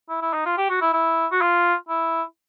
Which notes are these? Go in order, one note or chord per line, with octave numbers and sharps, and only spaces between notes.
E4
E4
D#4
F4
G4
F#4
E4
E4
F#4
F4
E4